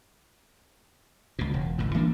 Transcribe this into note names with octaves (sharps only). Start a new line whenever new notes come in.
C#2 A#2
E1
G#1 C#2 A2
E3 A#3 D4